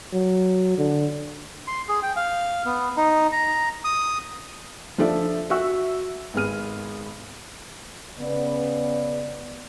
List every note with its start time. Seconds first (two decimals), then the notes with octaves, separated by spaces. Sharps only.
0.13 F#3
0.78 D3
1.67 C6
1.89 G#4
2.03 G5
2.16 F5
2.65 B3
2.97 D#4
3.32 A#5
3.85 D#6
4.98 F3 D4 F4 A4 D5 E5
5.50 F#4 E5 C#6 E6 F#6
6.34 G#1 B3 G#4 F6 D#7
8.20 C#3 B3 D5